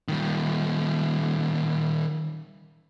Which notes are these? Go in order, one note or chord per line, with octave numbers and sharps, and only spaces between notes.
D#3 G3